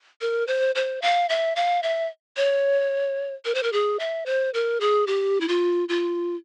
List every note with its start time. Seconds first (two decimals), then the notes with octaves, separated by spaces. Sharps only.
0.21 A#4
0.47 C5
0.75 C5
1.02 F5
1.29 E5
1.56 F5
1.83 E5
2.37 C#5
3.45 A#4
3.55 C5
3.63 A#4
3.73 G#4
3.99 E5
4.26 C5
4.54 A#4
4.80 G#4
5.07 G4
5.41 E4
5.48 F4
5.89 F4